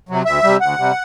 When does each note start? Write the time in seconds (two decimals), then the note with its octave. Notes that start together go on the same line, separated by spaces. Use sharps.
0.09 C3 F#3
0.25 D2 E5
0.43 C3 G3
0.60 D2 F#5
0.78 C3 G3